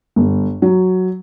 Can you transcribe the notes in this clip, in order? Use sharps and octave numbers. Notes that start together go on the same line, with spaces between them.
G1
F#3